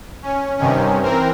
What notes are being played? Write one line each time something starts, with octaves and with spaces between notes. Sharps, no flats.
C#4
G2 C3 D#3 C#4
E3 C4 A#4